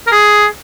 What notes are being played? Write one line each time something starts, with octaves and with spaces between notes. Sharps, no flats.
A#4
G#4